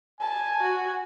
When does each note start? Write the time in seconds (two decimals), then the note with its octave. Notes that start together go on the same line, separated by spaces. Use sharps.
0.21 G#5 A5
0.61 F#4